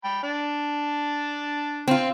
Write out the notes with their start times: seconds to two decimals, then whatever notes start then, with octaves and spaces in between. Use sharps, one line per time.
0.04 G5 B5
0.23 D4 A5
1.88 C4 F4